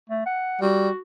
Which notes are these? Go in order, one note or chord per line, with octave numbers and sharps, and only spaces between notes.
A3
F#5
G3 F#4